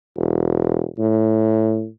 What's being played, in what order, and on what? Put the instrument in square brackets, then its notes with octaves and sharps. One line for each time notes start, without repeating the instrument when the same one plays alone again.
[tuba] E1
A2